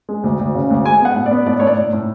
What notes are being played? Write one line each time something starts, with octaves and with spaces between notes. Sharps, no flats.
G#3
D2
D2
C#3
D2
G#3 G#5
B3 F#5
A2
D5
B3
A2 D5
A2 C#5
D5
A2
A2